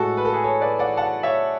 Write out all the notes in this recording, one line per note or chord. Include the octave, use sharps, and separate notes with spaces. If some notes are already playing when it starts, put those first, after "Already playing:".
Already playing: A2 G#3 F#4 A4
B4
A4
G#4 B4
A4 C#5
B4 D5
D5 F#5
F#5 A5
C#5 E5